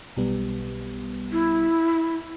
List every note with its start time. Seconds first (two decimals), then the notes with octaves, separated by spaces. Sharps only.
0.17 B1 G3 B3
1.32 E4